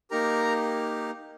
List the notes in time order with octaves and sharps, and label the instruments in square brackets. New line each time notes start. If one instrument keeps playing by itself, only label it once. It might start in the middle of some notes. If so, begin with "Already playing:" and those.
[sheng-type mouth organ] A#3 D#4 G4 A#4 A#5